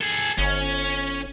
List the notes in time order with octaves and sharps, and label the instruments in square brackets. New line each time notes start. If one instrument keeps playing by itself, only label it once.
[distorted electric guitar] G#4 A4
[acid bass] G1 [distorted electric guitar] C#4